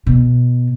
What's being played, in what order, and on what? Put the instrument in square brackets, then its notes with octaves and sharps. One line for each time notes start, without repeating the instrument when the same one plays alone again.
[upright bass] B2